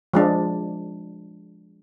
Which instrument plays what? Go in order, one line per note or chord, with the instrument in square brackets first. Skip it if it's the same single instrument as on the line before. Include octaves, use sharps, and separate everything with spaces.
[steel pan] F3 G#3 D4